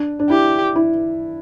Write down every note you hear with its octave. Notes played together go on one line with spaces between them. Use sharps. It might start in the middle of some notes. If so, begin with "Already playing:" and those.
Already playing: D4
D4
E4 G4
E4